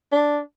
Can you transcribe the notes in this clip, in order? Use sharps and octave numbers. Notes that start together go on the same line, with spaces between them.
D4